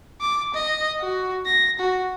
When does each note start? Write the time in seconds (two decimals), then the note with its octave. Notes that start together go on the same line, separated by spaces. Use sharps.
0.21 D6
0.54 D#5
1.00 F#4
1.46 A#6
1.79 F#4